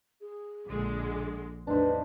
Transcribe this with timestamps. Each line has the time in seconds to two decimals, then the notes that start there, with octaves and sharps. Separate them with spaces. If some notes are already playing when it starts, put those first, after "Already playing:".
0.21 G#4
0.66 A#1 D3 G#3
1.67 E2 A2 F#3 D4 D#4 B4 C5